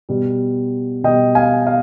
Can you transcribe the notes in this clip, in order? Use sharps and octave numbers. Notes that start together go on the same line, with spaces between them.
B2 G3
B2 G3 D#5 G5
F5 G#5
F5